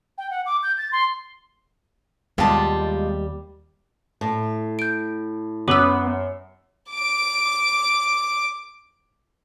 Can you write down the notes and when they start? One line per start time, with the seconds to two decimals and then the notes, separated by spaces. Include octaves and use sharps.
0.18 G5
0.30 F#5
0.46 D6
0.63 G6
0.78 A6
0.92 C6
2.38 D#2 B2 G3 G#3 F4 G4 A5
4.21 A2
4.79 G6 D7
5.68 F#2 B3 D6 E6
6.92 D6 D7